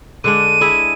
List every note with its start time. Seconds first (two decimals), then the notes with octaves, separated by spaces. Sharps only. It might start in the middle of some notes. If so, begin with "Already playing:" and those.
0.24 D3 G#3 D4 D#7
0.61 E4 G#4 E5